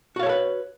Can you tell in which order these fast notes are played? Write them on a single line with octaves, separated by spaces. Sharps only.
F#4 F5 C#5 A4 B4